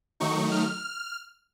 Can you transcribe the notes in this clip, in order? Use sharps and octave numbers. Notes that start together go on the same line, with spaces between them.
D#3 F#3 A3 D#4 C#6
F6